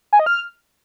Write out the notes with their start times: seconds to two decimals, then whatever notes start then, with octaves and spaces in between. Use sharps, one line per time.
0.13 G#5
0.19 D#5
0.26 F6